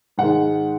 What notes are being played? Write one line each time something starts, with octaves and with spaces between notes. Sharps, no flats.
G#2 D#3 G#3 F#5